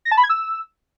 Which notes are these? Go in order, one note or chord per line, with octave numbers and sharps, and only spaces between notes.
A#6
A5
B5
G#6
E6